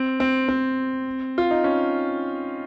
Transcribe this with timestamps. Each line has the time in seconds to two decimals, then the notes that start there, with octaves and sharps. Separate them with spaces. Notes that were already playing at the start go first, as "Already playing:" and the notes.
Already playing: C4
0.20 C4
0.49 C4
1.38 F4
1.51 D#4
1.64 C#4